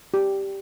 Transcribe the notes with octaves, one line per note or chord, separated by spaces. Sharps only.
G4